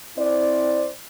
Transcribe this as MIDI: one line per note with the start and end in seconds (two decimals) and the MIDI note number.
0.18 0.89 60
0.18 0.89 64
0.18 0.89 72
0.18 0.89 74